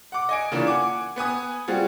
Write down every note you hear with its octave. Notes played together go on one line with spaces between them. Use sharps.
F#5 D6
D#5 G#5 D7
C#3 E3 A#3 C#4 D4 F4
F#5 G#5 D6
B3 B4 G#5 D#6
G3 C4 F4 F#4 G#4